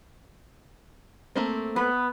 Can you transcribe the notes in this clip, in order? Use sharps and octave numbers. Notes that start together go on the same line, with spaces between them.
A3 A#3 C4
B3 B4